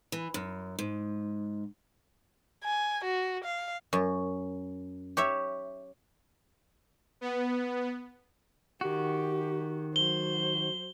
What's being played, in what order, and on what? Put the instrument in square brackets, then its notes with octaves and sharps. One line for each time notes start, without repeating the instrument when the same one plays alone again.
[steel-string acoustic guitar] E3
F#2
G#2
[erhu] G#5
F#4
F5
[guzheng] F#2
G4 C#5 E5
[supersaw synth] B3
[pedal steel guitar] D#3 F#4 [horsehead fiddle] G4
[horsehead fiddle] F#3 C5 [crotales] G7